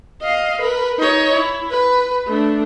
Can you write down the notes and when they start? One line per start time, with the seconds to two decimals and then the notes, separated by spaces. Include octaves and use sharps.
0.22 D#5 F5
0.61 A#4 B4
0.99 D#4 C#5
1.34 E4
1.70 B4
2.27 A3 D4